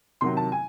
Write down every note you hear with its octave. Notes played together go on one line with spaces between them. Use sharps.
C3 D#3 F#3 C6
A5
G#5